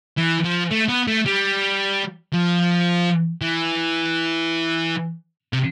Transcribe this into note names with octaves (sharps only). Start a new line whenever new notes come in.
E3
F3
A3
B3
A3
G3
F3
E3
C3